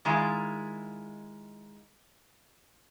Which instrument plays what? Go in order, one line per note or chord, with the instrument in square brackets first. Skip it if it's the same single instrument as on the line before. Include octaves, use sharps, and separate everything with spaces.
[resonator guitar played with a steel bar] D#3 G#3 E4 F4